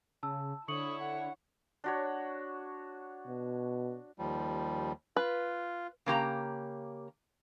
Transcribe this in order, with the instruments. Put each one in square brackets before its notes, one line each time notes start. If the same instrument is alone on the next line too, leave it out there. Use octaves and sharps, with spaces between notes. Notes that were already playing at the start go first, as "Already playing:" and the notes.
[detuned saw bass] C#3 [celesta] A5 E6
[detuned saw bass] D3 [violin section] E4 C#5 [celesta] C#6 C#7 F#7 [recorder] D#6
[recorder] F#5
[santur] D4 F#4 C#5
[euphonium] B2
[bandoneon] D#2 F3 G3
[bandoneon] F4 [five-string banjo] B4
[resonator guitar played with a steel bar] C#3 A#3 G4 A#5